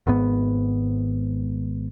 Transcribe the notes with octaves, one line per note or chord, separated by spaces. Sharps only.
G#1 G#2 B3